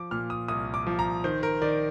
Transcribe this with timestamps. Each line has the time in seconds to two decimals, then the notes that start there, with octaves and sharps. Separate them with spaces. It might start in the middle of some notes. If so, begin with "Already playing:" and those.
Already playing: F3 D6
0.11 A#2 F6
0.30 D#6
0.48 C2 D#6
0.74 D6
0.87 F3
0.99 A#5
1.24 D#3 C5
1.43 A#4
1.62 D#3 D5